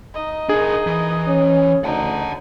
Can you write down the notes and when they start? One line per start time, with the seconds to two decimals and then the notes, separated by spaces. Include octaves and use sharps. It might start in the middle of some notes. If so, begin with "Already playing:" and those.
0.14 D#4 D#5
0.49 D4 G#4 A#4
0.87 E3
1.28 C#4
1.84 D2 D#4 F#5 A5